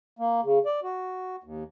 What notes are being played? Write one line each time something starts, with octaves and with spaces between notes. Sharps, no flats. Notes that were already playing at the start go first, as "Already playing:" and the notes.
A#3
C#3
D5
F#4
D#2